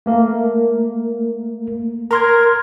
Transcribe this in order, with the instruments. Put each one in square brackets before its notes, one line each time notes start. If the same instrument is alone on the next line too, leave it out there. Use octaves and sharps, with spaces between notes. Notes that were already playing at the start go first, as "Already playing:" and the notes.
[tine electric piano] A3 A#3 A#4
[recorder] A#4 [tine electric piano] A#5 C6 G#6